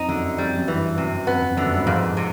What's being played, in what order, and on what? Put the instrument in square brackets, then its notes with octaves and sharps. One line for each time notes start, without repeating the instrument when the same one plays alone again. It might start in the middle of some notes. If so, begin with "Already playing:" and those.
Already playing: [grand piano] F2 [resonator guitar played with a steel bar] D#4
[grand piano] F#2 [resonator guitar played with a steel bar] D3
[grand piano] F2 [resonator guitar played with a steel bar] G3
[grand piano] F#2
[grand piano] G2 [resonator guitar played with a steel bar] E3
[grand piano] F#2 [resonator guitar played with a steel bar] C3
[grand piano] F2 [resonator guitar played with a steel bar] B3
[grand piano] F2
[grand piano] F#2 [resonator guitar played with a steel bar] D3
[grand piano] G2
[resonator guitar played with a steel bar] F2 [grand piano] G#2
[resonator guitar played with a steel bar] C3